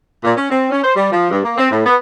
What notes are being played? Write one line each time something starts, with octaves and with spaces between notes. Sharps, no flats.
A#2
C#4
C4
C#4
C5
G3
F3
G2
A#3
C4
A2
B3